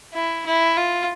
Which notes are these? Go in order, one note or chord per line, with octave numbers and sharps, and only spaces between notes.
E4
E4
F4